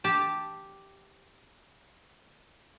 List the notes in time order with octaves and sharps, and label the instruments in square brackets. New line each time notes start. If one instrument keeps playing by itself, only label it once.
[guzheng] G4 A5